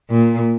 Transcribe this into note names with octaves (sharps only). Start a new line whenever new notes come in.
A#2